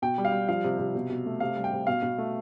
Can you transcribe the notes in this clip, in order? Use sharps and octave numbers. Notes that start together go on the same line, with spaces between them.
B2 G5
G3
F5
G3
F3 F5
C3
C3
B2
B2
A3
C3 F5
G3
G5
C3
B2 F5
B2
A3